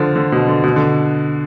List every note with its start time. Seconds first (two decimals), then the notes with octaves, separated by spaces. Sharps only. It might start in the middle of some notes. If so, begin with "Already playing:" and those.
Already playing: D3 F3
0.16 D3
0.32 B2
0.48 D3
0.64 B2
0.76 D3